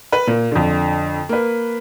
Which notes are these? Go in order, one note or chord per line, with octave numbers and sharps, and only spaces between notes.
B4
A#2
F2 D3
A#3 B4